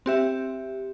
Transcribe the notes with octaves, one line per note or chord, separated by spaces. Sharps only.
C4 G4 E5